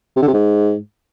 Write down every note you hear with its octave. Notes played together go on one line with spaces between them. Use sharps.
C3
D3
C3
G#2